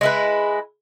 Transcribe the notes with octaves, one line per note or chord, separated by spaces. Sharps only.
G#3 E4 B4